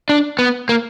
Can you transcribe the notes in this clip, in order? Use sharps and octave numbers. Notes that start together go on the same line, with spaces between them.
D4
B3
A#3